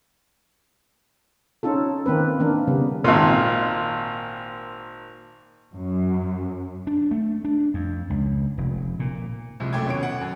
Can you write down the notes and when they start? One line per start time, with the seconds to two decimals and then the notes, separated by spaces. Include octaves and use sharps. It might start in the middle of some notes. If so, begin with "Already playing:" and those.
1.63 C#4 D#4 F4 A4
2.06 D#3 A#3 C4 B4
2.40 E3 A#3 D4
2.68 C#3 G3 B3
3.04 G#1 A#2
5.75 F#2
6.87 D4
7.11 A3
7.45 D4
7.74 F2
8.10 C#2
8.58 F1
8.99 A#2
9.60 C2 C3 F3 G#3
9.73 F#2 A3 G5 D6 G#6
9.86 D#1 B2 C#4 C#5 D6 D7
10.03 F#5
10.21 F#2